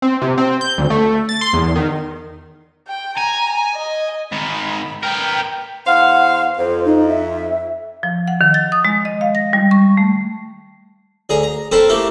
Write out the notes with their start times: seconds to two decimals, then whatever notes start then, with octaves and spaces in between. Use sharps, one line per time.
0.02 C4
0.22 C3
0.38 C4
0.61 G6
0.78 D2
0.90 A3
1.29 A6
1.41 C6
1.53 E2
1.76 D#3
2.87 G5
3.18 G#5 A#5
3.74 D#5
4.32 G#2 D#3 B5
5.03 B3 A#4 G5
5.87 E2 C5 F5 F#5
6.58 F2 C5
6.85 D#4
7.09 E5
8.03 F3
8.28 F#5
8.41 D#3
8.54 A6
8.72 D#6
8.85 G#3
9.05 D#5
9.21 F5
9.35 A#6
9.53 G3
9.71 C#6
9.97 A3
11.30 D2 G#4 A#5
11.43 A#5
11.72 C4 A4 A#4 C5 B5
11.89 A3 A#3 E4 G4